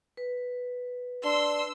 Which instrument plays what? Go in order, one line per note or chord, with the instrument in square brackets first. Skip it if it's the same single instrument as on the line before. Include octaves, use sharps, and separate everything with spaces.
[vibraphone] B4
[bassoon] D4 [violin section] C6 E6